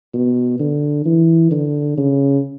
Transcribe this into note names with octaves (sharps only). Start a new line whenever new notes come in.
B2
D3
E3
D3
C#3